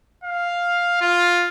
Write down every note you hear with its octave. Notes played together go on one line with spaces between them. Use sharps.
F5
F4